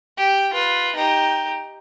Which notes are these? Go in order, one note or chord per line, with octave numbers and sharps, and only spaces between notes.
G4
F4 B4
D#4 G4